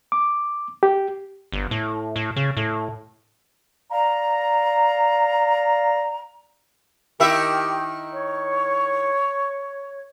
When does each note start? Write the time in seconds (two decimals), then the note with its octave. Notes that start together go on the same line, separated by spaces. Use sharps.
0.12 D6
0.83 G4
1.52 G1
1.71 A2
2.16 A2
2.36 C#3
2.57 A2
3.91 D5 F5 A#5
7.20 D#3 E4 G4 E5
8.13 C#5